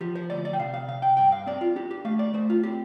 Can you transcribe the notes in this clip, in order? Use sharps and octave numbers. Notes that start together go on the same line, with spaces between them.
F3 G4
C5
D2 D5
D5
G5
C3 F5
F5
C3 F5
G5
G2 G5
F5
C4 D5
F4
D4 G4
G4
A3 F5
D5
A3 C5
F4
C4 G4